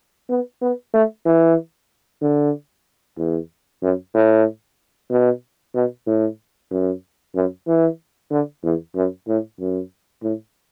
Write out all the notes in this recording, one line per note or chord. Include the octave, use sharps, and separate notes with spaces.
B3
B3
A3
E3
D3
E2
F#2
A2
B2
B2
A2
F#2
F#2
E3
D3
E2
F#2
A2
F#2
A2